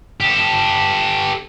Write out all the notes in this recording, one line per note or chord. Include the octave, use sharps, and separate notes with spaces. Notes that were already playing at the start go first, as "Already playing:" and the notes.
G4 A4